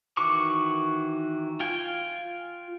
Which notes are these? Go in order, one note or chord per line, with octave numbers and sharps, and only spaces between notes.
D#3 E3 F#4 C#6 D6
F4 G5 G#5